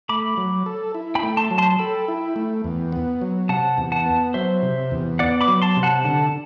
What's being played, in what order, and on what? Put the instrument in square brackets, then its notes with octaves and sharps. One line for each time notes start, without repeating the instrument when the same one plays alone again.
[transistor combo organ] A3 [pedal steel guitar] B5 D6
[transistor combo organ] F#3
A4
E4
[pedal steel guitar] G5 B5
[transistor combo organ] A3
[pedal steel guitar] A5 C6
[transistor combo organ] F#3
[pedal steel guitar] A5 C6
[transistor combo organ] A4 [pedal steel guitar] G5 B5
[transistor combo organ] E4
A3
E2
B3
F#3
[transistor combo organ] C3 [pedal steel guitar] F#5 A5
[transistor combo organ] E2
[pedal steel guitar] F#5 A5
[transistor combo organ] B3
[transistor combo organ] F#3 [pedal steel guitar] C5 E5
[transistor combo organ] C3
E2
[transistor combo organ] B3 [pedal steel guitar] D5 F#5
[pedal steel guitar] B5 D6
[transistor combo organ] F#3
[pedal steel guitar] A5 C6
[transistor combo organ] C3
[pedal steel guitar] F#5 A5
[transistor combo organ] D3 [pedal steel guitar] F#5 A5